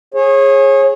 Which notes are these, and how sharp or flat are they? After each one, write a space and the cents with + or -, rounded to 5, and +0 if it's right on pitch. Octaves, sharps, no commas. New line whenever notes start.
G#4 +0 C#5 -30